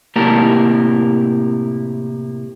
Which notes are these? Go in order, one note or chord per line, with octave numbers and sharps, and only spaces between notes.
A2 C3 A#3 G4 A#4 A5